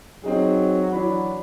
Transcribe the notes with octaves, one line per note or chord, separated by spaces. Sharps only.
F#3 C4 D#4 G#4
E3 F#3 D4 B5